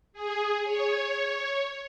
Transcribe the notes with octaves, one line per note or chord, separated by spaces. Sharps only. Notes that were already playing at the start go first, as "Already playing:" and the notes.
G#4
C#5